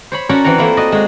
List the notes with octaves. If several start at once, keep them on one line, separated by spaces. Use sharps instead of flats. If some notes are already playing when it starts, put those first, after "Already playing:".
C5 C#5 B5
C#4 F#4 A4 A#4 C#5 D5
E3 C4 F#5 A#5
A3 A#3 E4 F4
F#4 D5 D#5
G#3 F#4